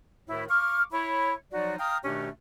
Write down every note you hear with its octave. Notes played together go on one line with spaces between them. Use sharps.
D2 A2 D#3 E4
F5 C#6 D6 F6
E4 C#5 B5
F3 F#3 D#4 F#4 D5
F5 G5 A#5 D#6 F6
B2 D#3 A3 C#4 D4 G4